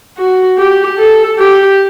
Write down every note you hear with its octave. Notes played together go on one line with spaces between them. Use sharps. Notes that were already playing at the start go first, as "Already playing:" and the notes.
F#4
G4
A4
G4